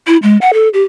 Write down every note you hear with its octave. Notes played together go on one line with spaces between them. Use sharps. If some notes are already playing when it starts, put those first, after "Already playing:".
E4
G#3
F#5
A4
G4